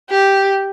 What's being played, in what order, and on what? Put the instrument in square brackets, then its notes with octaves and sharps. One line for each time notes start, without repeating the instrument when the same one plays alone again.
[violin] G4